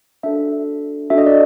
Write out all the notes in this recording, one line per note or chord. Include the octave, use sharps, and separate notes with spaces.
D4 F#4 A4 E5
D4 F#4 A4 E5
D#5
D5